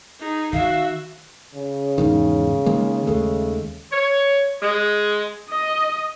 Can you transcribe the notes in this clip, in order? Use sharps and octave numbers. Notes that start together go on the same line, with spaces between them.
D#4 G#4
D#3 F#4 E5 F5
C#3
E2 G#2 D#3
D#3 G#3 A#3
D#2 G#3 A3
C#5
G#3
D#5 D#6